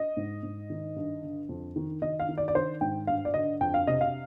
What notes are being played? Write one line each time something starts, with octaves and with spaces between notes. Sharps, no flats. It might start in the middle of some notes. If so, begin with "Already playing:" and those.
Already playing: D#5
G#2
G#2
D#3
G2
D3
F2
D#3
D#3 D#5
F5
D#3
D5
D5
D#3 C5
G#2 G5
G2 F5
D5
D3 D#5
F2 G5
F5
C3 D#5
F5